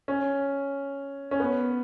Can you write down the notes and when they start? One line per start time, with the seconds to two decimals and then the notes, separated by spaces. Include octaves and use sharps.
0.08 C#4
1.31 C#4
1.40 B3